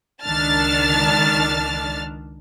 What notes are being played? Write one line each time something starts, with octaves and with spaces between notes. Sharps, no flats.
C#2 D#3 D4 A5 F6 A6